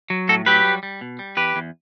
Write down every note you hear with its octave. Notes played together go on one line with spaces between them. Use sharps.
F#3
A2 F#4 A4
F#3 G4 B4
G3
G3
B2
G3
E2 G4 B4
E2